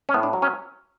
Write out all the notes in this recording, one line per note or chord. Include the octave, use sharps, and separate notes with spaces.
C#4
A2 B3
D4
F#3
C#4